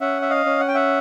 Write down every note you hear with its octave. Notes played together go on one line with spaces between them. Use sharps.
C#4 E5 F#5
E5
D#5 F5
C#4
F#5
G5
E5 F#5